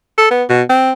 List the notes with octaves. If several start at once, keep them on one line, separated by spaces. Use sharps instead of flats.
A4
B3
B2
C4